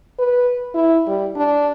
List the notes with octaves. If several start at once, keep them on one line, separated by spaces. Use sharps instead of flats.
B4
E4
G3
D4